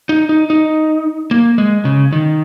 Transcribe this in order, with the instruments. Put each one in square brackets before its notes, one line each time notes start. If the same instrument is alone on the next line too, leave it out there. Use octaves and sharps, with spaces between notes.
[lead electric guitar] D#4
D#4
D#4
A#3
G#3
C#3
D#3